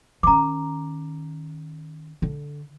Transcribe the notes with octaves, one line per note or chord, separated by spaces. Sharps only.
D#3 C#4 A#5 D6
D3